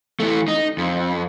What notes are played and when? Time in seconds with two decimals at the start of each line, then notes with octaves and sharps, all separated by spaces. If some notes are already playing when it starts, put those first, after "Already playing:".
0.20 E3 A3
0.48 D#4
0.78 F2